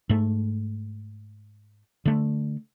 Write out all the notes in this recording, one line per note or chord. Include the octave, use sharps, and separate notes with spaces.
G#2 A3
D3 A3